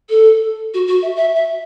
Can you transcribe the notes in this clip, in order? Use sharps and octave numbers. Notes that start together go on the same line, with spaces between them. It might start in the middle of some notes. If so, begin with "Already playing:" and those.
A4
F#4
F#4
E5
E5
E5